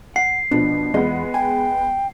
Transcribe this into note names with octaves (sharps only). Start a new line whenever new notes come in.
F#5 C7
B2 F3 D4
E2 G#3 B3 F4 D#5
G5 G#5